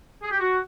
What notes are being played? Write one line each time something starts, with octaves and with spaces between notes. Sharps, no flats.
G#4
G4
F#4